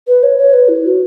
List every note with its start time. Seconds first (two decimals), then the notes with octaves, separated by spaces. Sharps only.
0.08 B4
0.23 C#5
0.38 C#5
0.53 B4
0.68 E4
0.85 F#4